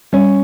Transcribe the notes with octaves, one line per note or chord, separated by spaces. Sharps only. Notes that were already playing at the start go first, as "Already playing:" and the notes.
G3 C#4